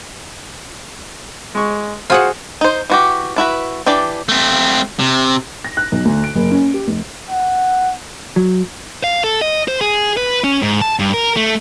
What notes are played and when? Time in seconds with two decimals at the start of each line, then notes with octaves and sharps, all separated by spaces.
1.55 G#3 C#6
2.10 F4 F#4 G#4 C5 F5 F#5
2.61 D#4 C5
2.90 E3 F#4 G4
3.36 D4 E4 F#4 B4
3.86 E3 D4 G4 D5
4.29 A3 C4
4.99 C3
5.64 A#6
5.77 F#6
5.92 B1
6.05 D2
6.24 D7
6.35 F#1
6.51 C#4
6.74 G4
6.87 F1
7.30 F#5
8.36 F#3
9.04 F5
9.24 A4
9.42 D#5
9.68 C5
9.81 G#4
10.17 B4
10.44 C#4
10.63 G#2
10.81 A5
10.99 G2
11.14 A#4
11.36 A3